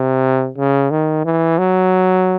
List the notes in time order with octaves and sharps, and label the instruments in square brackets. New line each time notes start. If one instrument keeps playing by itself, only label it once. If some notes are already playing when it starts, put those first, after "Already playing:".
Already playing: [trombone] C3
C#3
D#3
E3
F#3